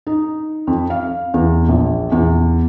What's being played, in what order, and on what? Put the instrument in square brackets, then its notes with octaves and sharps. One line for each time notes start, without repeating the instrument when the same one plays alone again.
[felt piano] D#4
F2
F5
E2
A#1
E2